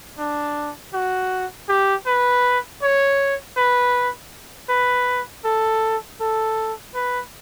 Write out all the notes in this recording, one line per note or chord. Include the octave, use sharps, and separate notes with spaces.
D4
F#4
G4
B4
C#5
B4
B4
A4
A4
B4